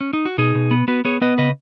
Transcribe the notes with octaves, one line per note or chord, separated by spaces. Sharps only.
C#4
D#4
F#4
B2 D#4 G#4
B2
B3
B3 F#4 B4
B3 G#4 C#5
B3 B4 D#5
C#3 B4 D#5